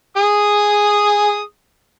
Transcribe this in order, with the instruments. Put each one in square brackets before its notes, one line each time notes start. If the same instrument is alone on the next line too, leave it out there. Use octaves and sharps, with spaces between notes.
[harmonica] G#4 D#6